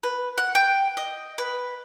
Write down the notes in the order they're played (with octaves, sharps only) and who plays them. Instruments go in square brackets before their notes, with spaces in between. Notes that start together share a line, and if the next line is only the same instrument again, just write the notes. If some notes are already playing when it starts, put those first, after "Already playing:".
[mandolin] B4
F#5
G5
D#5
B4